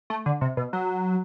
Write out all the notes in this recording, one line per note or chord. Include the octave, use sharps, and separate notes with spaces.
A3
D3
C3
B2
F#3